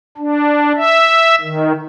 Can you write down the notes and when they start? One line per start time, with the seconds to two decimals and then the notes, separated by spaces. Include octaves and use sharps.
0.17 D4
0.76 E5
1.41 D#3